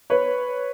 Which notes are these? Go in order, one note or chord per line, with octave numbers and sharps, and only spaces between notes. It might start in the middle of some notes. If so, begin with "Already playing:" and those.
B4 C#5